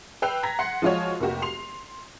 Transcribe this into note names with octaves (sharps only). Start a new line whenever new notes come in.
B4 G5 E6 F#6 C7 F7
A#5 G#6 A#6 B6
F#5 C6 C7
F3 G#3 F4 F#4 C#5
F1 A#3 F#4 G4
C6 C7 F7